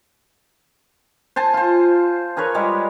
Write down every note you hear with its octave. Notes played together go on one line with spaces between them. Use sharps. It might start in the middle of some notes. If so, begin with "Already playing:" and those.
C5 G#5 A5
F4 C5
G#4 A#4 B4 C#5
G3 G#3